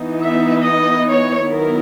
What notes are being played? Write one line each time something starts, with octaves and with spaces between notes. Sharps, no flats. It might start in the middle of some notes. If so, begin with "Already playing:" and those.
Already playing: E3 B3 D#4
E5
D#5
C#5
D#3 F#3 B3 E4 A#4